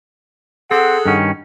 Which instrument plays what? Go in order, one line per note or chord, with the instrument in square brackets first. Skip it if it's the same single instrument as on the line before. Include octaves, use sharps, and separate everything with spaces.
[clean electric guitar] C4 [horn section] G#4 A4 F#5
[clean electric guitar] G2 D#3 C#4